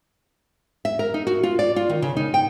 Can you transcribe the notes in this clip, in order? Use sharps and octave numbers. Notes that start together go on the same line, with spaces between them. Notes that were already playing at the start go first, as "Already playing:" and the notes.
E5
A#4
D#4
F#4
F4
D5
F4
D#3
C#3
D#4
G5